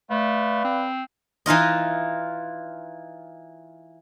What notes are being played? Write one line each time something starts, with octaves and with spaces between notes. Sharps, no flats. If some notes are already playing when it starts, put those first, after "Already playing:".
A3 B4 D5 F5
C4
E3 D#4 F4 D#5